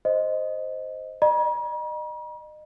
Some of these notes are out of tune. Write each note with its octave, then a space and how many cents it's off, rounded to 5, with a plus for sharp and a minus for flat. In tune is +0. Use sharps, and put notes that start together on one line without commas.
C5 +0 D#5 +0
D#5 -30 A#5 +45